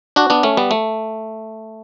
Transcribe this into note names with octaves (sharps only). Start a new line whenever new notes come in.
D4 F#4
B3 D4
A3 C#4
G3 B3
A3